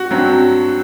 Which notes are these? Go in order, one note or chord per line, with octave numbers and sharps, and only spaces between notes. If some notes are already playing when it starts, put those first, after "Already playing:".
Already playing: F#4
G2 F#3 C4